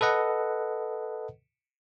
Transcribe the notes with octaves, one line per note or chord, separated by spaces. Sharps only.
A4 B4 D#5 F#5